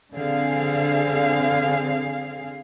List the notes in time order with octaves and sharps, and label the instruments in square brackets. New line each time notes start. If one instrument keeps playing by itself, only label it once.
[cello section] D3 C4 G#4 F5